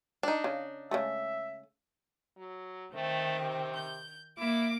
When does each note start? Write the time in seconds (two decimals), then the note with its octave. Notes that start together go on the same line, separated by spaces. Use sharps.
0.23 D4 D#4
0.44 C#3
0.91 C#3 G#3 A3 E5
2.38 F#3
2.94 D#3 A3 C4
3.40 C3
3.75 G6
4.38 A#3 E4 D6